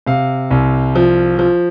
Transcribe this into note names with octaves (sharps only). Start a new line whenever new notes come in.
C3 F5
C2
F3
F3